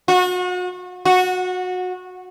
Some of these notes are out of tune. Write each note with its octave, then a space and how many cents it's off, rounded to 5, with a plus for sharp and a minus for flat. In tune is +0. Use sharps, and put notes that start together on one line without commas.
F#4 -35
F#4 -20